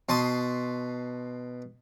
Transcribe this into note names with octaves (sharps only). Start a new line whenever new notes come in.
B2 A5 C6 D#6